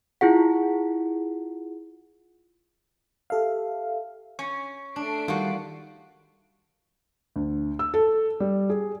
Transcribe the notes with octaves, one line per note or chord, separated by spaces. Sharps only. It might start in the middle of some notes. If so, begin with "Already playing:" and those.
E4 F4 G#4 F#5
G4 A4 E5 F5
C#4 C#6
A3 D4 C7 D7
D#3 G3 F4 F#4
D2
E6
A4
G3
G#4